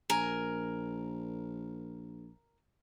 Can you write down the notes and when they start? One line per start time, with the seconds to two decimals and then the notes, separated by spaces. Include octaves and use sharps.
0.10 A#1 A#4 G#5